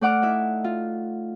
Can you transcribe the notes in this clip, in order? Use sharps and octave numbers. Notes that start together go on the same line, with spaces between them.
A3 D5 F#5 D6 F6
D#4 E4 E5
F4